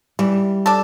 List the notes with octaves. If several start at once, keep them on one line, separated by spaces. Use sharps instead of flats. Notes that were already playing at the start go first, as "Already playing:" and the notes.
E3 G3
D4 A4